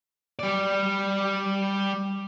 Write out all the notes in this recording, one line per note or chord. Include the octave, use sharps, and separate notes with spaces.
G3 D5